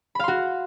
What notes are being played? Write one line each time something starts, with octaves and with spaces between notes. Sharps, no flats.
F#4 F5 B5 C6